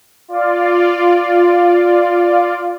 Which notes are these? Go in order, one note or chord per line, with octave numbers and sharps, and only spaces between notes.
F4 D5